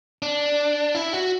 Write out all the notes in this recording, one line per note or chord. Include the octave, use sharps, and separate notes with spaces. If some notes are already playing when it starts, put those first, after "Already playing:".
D4
E4
F#4